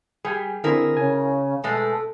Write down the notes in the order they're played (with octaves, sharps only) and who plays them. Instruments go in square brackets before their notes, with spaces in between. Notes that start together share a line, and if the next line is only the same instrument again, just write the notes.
[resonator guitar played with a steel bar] G3 [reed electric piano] G#4 G5 G#5
[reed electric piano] D3 C4 [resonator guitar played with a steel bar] E4 G#4 A#4
[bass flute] C#3 [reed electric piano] G#5
[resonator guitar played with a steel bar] B2 G#3 A3 [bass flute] A4